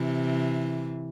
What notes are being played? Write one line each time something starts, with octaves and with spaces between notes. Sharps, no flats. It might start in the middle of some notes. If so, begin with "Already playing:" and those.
Already playing: C3 E3